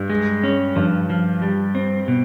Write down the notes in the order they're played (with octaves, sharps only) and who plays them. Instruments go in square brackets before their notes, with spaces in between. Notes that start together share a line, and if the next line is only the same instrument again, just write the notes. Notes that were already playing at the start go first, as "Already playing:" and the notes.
Already playing: [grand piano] G2
[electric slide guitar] G#3
C#4
[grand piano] G2 [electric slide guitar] F3
[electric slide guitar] F3
G3
C4
B2